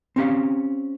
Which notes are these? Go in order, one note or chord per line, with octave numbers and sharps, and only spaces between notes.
C4 C#4 G4 F5